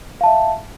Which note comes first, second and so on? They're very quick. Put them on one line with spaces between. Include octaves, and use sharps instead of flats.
F5 A5 E5